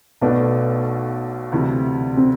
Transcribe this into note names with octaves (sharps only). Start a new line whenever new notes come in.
B1 B2 A3 B3 D4
D2 C3 E3
C4